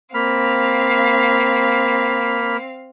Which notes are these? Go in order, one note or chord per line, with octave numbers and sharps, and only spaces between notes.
A#3 C4 F5 B5 F6